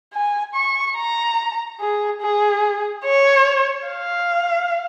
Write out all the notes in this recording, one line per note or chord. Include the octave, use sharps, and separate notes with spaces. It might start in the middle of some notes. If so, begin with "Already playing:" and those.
G#5
C#6
A#5
G#4
G#4
C#5
F5